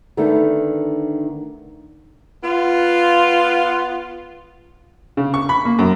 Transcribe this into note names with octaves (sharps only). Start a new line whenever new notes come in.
D3 D#3 A3 B3
B3 F4
C#3
C#6
B5
A#3
F#2